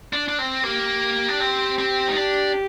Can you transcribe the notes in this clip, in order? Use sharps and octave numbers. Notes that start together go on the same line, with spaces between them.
D4
D4
C4
A#3 G4
D4
C4
C4
D#4
D4